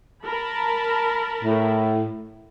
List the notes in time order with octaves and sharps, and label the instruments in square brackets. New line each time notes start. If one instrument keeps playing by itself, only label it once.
[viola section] A#4 A5 B5
[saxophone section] A2